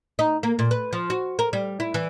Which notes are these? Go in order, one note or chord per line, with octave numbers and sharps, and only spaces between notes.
D#4
A#3
A#2
B4
F3
F#4
A#4
G3
E4
E3